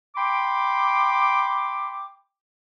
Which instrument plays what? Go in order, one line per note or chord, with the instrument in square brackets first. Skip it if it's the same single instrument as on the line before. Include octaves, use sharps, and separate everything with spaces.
[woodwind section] G5 B5 C6 D6